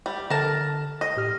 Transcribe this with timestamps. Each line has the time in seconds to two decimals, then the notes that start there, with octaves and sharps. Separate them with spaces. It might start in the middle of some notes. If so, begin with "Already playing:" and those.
0.06 G3
0.30 D3 A4 A#4 A5
1.01 D#5
1.17 A2 G4 F6